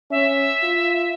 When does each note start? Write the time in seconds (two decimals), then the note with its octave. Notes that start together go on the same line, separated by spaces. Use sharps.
0.11 C#4 E5
0.63 F4